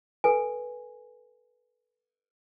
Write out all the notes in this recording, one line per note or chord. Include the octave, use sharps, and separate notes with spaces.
A4 B4 G#5